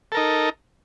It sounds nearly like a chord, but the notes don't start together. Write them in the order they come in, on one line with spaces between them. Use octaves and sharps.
A4 A#4 D#4